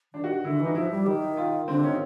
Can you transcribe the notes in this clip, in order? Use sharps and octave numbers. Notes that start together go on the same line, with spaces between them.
D#3 D4
F#4
D3 E4
E3
D#4
F3 E4
G3
D#3
F4
D3 C4
D#3 C#4